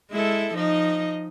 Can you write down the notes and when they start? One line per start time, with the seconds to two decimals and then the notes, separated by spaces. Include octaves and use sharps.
0.11 G#3 E4 A4
0.55 F3 D#4 D#5